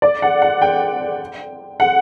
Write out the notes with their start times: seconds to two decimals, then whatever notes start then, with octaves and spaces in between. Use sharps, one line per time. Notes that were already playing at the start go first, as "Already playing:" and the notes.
0.02 D5
0.22 F#5
0.42 F#5
0.62 G5
1.80 F#5